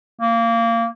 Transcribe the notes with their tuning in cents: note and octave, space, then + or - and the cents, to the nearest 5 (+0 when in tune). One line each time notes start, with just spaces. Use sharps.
A#3 -20